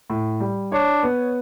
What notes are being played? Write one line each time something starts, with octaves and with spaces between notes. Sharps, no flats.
A2
G3
D4 C#5
B3